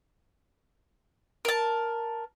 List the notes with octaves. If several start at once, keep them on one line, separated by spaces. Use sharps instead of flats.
A#4 A5